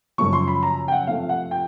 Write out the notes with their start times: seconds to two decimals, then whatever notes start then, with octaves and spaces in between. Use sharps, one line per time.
0.18 F#2 C#3 F3 C#6
0.33 C6
0.48 B5
0.63 A#5
0.88 G5
0.92 F#5
1.07 C3 F3 A3 F5
1.29 F#5
1.51 G5